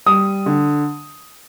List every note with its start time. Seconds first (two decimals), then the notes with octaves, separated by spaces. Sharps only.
0.06 G3 D#6
0.46 D3